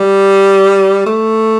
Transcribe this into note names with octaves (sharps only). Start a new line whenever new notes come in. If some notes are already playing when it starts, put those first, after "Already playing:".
Already playing: G3
A3